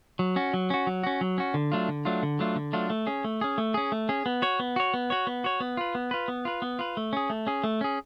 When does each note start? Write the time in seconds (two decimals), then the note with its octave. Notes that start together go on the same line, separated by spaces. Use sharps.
0.19 F#3
0.36 C#4 F#4
0.54 F#3
0.70 C#4 F#4
0.87 F#3
1.03 C#4 F#4
1.21 F#3
1.38 C#4 F#4
1.54 D3
1.72 F#3 A3 D4 F4
1.88 D3
2.05 F#3 A3 D4 F4
2.23 D3
2.39 F#3 A3 D4 F4
2.56 D3
2.73 F#3 A3 D4 F4
2.90 A3
3.07 C#4 G#4
3.24 A3
3.41 C#4 G#4
3.58 A3
3.74 C#4 G#4
3.92 A3
4.09 C#4 G#4
4.26 B3
4.42 F#4 C#5
4.60 B3
4.76 F#4 C#5
4.94 B3
5.10 F#4 C#5
5.27 B3
5.44 F#4 C#5
5.60 B3
5.77 F4 B4
5.95 B3
6.11 F4 B4
6.28 B3
6.45 F4 B4
6.62 B3
6.79 F4 B4
6.97 A3
7.13 C#4 G#4
7.30 A3
7.47 C#4 G#4
7.64 A3
7.81 C#4 G#4